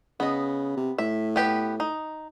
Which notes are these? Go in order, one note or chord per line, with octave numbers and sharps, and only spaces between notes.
C#3 B3 D#5
C3
A2 E5
B3 G4 B4
D#4